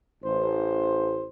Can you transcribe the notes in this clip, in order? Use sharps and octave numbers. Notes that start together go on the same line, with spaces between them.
A1 C5